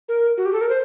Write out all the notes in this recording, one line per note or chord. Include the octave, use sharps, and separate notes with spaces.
A#4
F#4
G4
A4
A#4
C5